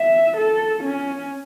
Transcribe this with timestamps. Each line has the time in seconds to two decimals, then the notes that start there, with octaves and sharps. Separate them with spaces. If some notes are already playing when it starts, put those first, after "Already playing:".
Already playing: E5
0.37 A4
0.83 C#4